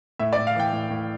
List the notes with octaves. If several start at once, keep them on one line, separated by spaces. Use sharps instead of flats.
A2 E5
D5
A2
F5
E3 G5
A2
A2